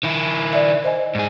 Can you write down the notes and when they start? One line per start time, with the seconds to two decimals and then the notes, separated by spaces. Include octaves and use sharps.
0.03 D#3 E4
0.53 D5 E5
0.84 C5 D#5 G#5
1.15 G#2 G#4